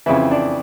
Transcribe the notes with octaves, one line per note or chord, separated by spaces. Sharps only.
F2 C#3 E3 E4
D4